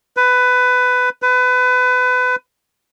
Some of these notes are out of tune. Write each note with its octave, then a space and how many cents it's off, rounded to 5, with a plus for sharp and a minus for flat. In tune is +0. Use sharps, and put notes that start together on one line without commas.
B4 +15
B4 +25